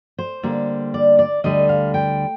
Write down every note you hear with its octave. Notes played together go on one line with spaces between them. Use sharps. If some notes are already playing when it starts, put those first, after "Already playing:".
C5
D3 G3 A#3
D5
D5
D2 D3 G3 D#5
F5
G5